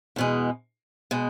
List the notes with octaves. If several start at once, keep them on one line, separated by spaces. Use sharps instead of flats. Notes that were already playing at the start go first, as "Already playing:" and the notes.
E2 B2 G#3
B2 G#3